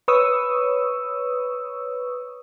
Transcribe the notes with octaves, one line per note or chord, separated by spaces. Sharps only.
B4 C#5 C#6 D#6 E6